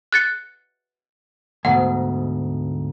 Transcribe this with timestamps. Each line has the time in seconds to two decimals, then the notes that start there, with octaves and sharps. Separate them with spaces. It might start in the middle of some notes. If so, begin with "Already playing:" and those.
0.13 F#6 A6 C#7
1.65 D2 G#2 B2 F#5